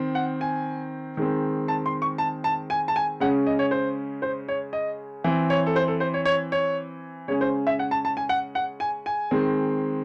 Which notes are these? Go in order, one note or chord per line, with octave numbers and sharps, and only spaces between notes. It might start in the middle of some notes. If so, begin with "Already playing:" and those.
Already playing: D#3 C4
F#5
G#5
D#3 G#3 C4
A5
C6
C#6
A5
A5
G#5
A5
G#5
C#3 G#3 C#4 F#5
D#5
C#5
C5
C5
C#5
D#5
E3 C4
C#5
A4
C5
A4
C5
C#5
C#5
C#5
C#3 G#3 C#4 C#5
C5
E5
F#5
A5
A5
G#5
F#5
F#5
G#5
G#5
D#3 G#3 C4